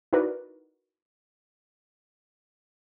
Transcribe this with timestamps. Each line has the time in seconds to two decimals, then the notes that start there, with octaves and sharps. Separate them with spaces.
0.13 D#4 E4 F#4 A#4 B4 D5